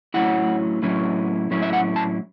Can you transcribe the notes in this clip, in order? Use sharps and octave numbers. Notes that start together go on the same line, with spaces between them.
A2 F#3 C#4 E4 F#5
A2 F#3 C#4 E4
A2 F#3 C#4 E4
E5
F#5
A5